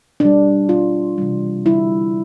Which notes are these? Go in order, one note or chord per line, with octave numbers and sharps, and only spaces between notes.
B2 G3 D4
B2 G3 F4
C3 E3 G3
D3 G3 E4